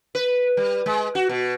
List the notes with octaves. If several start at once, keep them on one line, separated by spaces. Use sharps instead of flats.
B4
G3
G#3
F#4
B2